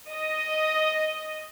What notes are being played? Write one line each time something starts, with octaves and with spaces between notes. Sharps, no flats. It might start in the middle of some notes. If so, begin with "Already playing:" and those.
D#5